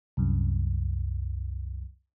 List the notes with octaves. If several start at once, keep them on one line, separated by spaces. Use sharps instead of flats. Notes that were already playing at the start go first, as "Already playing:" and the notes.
C2 F#2